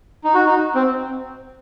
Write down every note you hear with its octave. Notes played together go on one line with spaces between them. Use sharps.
D#4
F#4
D#4
C4